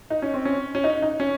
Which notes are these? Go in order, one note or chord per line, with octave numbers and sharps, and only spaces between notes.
D#4
C#4
C4
C#4
C#4
D#4
D#4
C#4